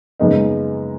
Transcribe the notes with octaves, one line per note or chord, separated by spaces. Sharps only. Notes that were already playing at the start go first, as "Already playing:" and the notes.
F#2 C#3 G#3 B3 D#4